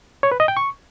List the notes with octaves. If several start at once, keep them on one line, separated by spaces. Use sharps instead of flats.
C#5
B4
D#5
G5
C#6